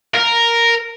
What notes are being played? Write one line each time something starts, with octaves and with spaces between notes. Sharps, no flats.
A#4